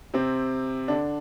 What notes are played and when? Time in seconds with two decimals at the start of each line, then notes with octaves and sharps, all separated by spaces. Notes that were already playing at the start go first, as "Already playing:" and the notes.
0.14 C3 C4
0.88 D3 D4